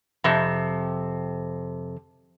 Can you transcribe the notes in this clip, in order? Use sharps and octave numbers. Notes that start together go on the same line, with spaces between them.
F2 C3